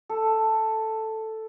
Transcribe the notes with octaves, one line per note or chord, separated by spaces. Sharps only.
A4